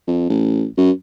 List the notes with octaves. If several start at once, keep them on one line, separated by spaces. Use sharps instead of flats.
F2
A1
F#2